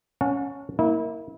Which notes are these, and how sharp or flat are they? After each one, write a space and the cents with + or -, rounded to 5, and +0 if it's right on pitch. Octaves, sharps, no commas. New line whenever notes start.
C#4 +0 F#5 -35 A5 +20
A#3 +0 E4 -35